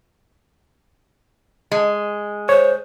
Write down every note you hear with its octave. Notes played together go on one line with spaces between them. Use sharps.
G#3
C5 C#5